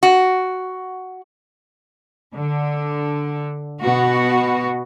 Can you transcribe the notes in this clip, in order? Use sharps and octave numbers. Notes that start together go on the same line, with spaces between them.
F#4
D3
B2 B3 F#4